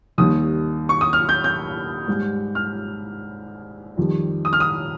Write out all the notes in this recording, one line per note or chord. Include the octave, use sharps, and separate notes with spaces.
D#2 D#3 G3 D#6
C#6
D#6
F6
G6
G6
G#2 G3
F6
F2 D#3 G3
D#6
F6
D#6